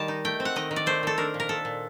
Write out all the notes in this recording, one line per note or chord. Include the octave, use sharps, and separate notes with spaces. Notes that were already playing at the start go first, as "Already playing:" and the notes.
Already playing: D#3 G3 A5
D#4
A3 G5
C4
F#5
D#3 D#5
D#3
D5
A3 C5
D#3 A4
D4 A#4
A#2
A#4
A#2 A4
A#2